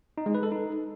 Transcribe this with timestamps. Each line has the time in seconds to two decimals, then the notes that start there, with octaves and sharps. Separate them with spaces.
0.18 D#4
0.26 G#3
0.35 B4
0.43 A4
0.52 D#4